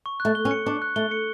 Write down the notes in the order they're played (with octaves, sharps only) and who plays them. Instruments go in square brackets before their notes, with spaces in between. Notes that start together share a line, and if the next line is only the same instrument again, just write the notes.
[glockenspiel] C#6
F#6
[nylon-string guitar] A3
[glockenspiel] G7
[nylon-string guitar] C#4
[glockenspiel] C#7
[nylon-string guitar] D4 [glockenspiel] C#6
[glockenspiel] F#6
[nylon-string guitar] A3 [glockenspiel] G7
[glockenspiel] C#7